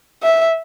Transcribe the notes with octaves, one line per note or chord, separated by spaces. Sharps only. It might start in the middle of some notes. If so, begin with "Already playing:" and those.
E5